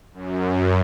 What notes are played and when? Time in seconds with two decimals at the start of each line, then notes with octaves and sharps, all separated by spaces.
0.14 F#2